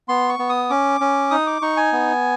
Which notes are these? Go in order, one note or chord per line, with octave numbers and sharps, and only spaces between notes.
B3 C6
C#6
B3
D#6
C#4 D6
C#4
D#4 D#6
D6
D#4 C#6
G#5
B3